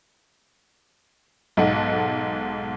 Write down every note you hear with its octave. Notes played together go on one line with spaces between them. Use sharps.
B1 G#2 D#4 A4 F#5